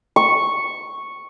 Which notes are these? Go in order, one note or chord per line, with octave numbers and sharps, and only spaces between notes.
C#6